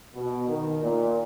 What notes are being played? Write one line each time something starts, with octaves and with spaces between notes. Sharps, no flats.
B2
D#3
A#2